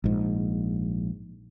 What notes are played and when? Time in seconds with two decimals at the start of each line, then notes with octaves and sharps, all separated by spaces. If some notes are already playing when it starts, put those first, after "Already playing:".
0.04 A#1 G#2